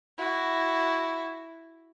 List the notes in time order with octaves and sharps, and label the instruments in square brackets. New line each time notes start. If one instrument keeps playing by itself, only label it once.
[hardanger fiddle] E4 F#4